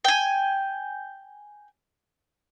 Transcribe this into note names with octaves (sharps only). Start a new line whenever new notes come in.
G5 G#5